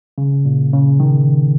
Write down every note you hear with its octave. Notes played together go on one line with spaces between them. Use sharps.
C#3
A#2
C#3
D#3